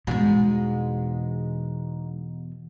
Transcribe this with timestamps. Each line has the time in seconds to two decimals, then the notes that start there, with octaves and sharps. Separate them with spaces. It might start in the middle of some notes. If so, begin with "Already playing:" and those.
0.07 E2 G#2 B2 G#3